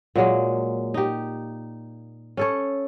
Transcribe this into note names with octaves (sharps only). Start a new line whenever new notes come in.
A#2 F#3 G#3 A#3
D#4 G4
C#4 A4 C#5